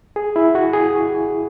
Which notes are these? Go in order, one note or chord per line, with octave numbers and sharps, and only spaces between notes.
G#4
E4
F#4
G#4